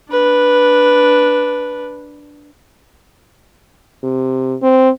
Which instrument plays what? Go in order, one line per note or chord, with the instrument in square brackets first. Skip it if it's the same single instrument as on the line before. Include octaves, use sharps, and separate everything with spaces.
[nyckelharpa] D4 B4
[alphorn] C3
C4